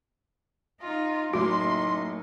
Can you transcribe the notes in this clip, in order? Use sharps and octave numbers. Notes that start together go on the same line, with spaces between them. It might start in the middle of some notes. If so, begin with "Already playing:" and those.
D#4 F4
F#1 A2 F#3 D#4 F#4 C6 D6